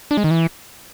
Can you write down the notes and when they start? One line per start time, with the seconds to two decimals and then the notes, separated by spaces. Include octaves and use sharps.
0.11 D4
0.17 G#3
0.24 D#3
0.31 E3